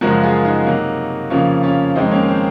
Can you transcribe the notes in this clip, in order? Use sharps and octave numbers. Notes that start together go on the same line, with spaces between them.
F#2 C#3 F3 G#3 F#4 A#4
F4 G#4
D#4 F#4
C3 F#3 A#3
F2 C#3 F3 A#3 C#4 F4
C#4 F4
F2 D#3 G#3 C4 D#4
A#3 C#4
C4